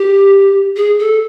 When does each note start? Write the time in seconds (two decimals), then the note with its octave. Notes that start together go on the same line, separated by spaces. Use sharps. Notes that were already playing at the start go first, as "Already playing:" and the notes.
Already playing: G4
0.76 G#4
0.99 A4